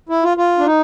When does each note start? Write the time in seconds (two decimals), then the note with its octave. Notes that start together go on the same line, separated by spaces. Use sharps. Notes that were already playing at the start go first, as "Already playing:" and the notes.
0.09 E4
0.23 F4
0.37 F4
0.58 D4
0.66 D#4